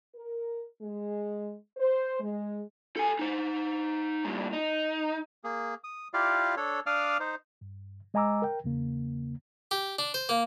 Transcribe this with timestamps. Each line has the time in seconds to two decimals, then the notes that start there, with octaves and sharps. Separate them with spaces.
0.15 A#4
0.82 G#3
1.77 C5
2.21 G#3
2.97 A4 G#5
3.19 D#4 C5
4.24 G2 A#2
4.53 D#4
5.44 A#3 G#4
5.84 D#6
6.14 E4 F4 G4 D5 F5
6.57 D4 A4 C#5
6.86 D4 D5 F5 D6 D#6 F6
7.20 D#4 C5
7.61 G2
8.14 G#3 D#5 G#5 A#5 D6 E6
8.42 A#4 G5
8.64 E2 C#3 A#3
9.71 G4
9.99 D4
10.14 C5
10.29 A#3